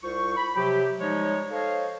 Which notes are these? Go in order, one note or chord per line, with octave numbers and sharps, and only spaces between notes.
C2 F4 C5 C#6
B5
C3 F3 F#3 G4
F3 G3 G#3 D#4 C#5
A4 C5 C#5 D#5 F5